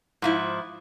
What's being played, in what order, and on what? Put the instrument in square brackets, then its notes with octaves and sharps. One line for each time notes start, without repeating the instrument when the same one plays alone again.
[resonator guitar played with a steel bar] G#2 F3 E4